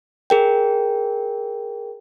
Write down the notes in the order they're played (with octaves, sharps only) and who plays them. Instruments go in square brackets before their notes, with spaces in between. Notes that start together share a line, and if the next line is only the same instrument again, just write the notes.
[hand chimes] G#4 A#4 G5